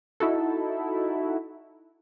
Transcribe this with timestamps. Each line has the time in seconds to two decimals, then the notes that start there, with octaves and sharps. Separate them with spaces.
0.20 D#4 E4 F#4 A4